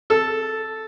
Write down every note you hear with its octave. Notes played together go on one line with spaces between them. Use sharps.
A4